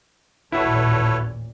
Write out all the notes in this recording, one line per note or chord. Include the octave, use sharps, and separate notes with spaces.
A1 D#2 A#2 E4 F#4 A4 B4 C#5